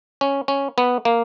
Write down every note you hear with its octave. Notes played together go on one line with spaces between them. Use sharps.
C#4
C#4
B3
A#3